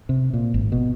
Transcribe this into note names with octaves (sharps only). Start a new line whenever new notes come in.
C3
A#2
G#1
B2